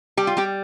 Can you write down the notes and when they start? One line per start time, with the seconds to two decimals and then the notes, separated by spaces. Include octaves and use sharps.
0.17 G3 G4
0.27 F4
0.37 G3 G4